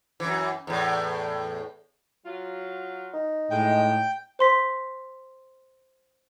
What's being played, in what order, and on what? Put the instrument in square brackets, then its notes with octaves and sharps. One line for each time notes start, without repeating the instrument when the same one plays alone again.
[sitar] F#2 E3
E2 A2
[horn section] F#3 F4
[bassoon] D#4
[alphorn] A2 [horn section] G#3 [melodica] G5
[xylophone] C5 C6 B6